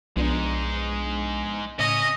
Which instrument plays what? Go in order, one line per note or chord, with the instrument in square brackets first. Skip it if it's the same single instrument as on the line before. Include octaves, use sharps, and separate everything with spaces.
[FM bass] B1 [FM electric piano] F3 B3 D4 [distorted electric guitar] G#3 D#4
[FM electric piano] A2 C#3 [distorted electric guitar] C#4 [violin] D#5